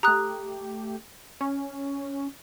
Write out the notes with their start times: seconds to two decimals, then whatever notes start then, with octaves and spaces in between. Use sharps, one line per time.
0.03 A3 G4 A#5 D#6 F#6
1.41 C#4